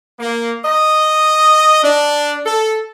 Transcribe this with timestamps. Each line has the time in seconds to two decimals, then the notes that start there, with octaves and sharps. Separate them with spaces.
0.19 A#3
0.64 D#5
1.83 D4
2.45 A4